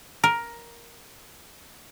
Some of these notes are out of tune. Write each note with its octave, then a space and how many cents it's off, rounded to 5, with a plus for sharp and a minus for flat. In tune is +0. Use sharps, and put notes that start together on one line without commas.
A#4 +10